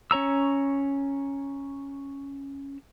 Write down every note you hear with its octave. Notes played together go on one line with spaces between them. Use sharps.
C#4 C#5 A#5 E6